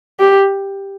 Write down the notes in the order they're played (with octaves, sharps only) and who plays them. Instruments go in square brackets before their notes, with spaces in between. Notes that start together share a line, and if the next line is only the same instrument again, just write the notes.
[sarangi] G4